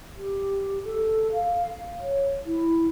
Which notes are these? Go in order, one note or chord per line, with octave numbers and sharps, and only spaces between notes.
G4
A4
F5
C#5
E4